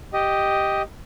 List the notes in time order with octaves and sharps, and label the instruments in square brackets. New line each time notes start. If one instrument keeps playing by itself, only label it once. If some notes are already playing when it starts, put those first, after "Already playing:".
[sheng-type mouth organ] G4 D#5